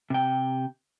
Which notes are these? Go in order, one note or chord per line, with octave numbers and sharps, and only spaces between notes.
C3 G5